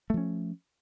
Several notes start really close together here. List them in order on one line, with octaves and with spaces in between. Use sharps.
A3 F3 C#4